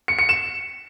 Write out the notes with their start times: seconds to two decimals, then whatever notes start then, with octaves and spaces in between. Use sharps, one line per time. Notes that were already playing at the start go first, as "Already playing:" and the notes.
0.08 C#7
0.19 C#7
0.29 E7